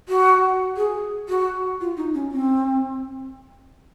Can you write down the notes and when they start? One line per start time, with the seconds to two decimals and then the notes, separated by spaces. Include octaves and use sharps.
0.09 F#4
0.77 G#4
1.29 F#4
1.81 F4
1.97 D#4
2.14 C#4
2.32 C4